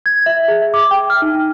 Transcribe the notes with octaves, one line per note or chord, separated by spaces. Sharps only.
G#6
E5
G#4
E5
D6
G5
F6
D#4
D#4